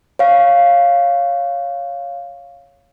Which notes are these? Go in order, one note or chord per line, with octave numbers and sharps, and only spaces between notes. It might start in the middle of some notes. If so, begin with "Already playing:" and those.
C#5 F5